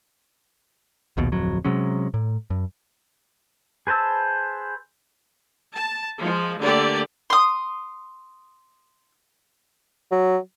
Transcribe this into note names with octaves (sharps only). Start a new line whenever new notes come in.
A#1 D#2 B2
D1 F2 F#3
C3 F#3 G#3 C#4
A2
F#2
G#4 B4 C5 A5 E6
A5
F3 G#3
D3 A3 A#3 G4 D5
C6 D#6
F#3